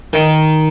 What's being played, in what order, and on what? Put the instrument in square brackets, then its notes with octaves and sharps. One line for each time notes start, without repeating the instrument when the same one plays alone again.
[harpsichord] D#3